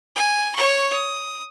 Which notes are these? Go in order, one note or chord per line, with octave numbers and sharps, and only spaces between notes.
G#5
C#5 C#6
D#6